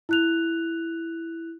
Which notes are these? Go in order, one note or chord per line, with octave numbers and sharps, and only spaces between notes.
E4 F#6 F7